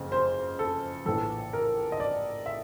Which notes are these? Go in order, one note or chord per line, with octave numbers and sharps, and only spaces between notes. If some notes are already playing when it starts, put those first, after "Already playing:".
Already playing: F#1 F2 C#3
C5
A4
A#1 A2 E3 A4
A#4
D#5
D5
E5